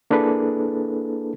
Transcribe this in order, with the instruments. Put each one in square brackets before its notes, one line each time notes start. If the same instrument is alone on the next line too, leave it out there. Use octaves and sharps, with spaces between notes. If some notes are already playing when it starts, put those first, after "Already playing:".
[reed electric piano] A#3 D4 E4 G#4 A4 B4